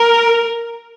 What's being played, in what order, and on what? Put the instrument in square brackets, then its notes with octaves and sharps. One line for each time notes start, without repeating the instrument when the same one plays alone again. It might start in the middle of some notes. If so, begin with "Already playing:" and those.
Already playing: [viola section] A#4